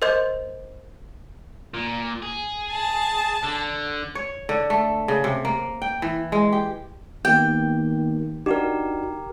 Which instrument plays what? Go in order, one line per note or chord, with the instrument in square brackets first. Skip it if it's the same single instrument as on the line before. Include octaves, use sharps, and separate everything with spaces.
[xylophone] A#4 C5 D#5 C6 G6
[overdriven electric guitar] A#2
G#4
[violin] A5
[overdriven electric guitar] D3
[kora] C#5
D3
A3
C#3
C3
A#3
G5
E3
G#3
G4
[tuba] D#3 [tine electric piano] A#3 B3 G4 [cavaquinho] G5
[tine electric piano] D4 D#4 F#4 [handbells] G4 A#4